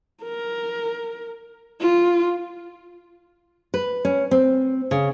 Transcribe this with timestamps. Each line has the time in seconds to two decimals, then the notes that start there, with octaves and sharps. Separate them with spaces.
0.23 A#4
1.81 F4
3.74 B4
4.05 C#4
4.31 C4
4.91 C#3